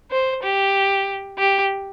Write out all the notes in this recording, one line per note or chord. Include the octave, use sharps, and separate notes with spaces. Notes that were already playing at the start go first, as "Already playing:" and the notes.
C5
G4
G4